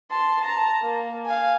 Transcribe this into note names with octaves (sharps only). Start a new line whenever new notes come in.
A5 C6
A5 A#5
A#3
F5 G#5